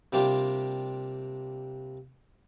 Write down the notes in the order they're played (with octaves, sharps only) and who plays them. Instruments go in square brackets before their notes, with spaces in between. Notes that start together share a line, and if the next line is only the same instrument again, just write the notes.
[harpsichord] C3 G3 A#3 D4 F4 G4